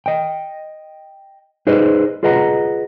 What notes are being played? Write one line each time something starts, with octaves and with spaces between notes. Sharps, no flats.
D#5 G5
D#4 G#4 B4 C5 D5 D#5
F4 G#4 B4 D#5 F#5 A#5